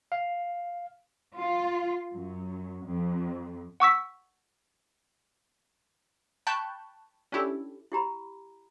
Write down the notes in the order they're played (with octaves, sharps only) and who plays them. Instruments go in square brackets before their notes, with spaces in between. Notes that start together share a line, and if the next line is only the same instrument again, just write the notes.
[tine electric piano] F5
[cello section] F4
F#2
F2
[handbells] F#5 C#6 E6 B6
[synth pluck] G5 A5 B5 C#6 F#6 G6
C#4 D4 E4 G4 A4
[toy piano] E4 G4 A#5 B5